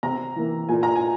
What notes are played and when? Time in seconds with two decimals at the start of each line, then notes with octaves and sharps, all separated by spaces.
0.03 C3 A#5
0.36 E3 A#3
0.69 A#2 G#5
0.83 A#5
0.96 G#5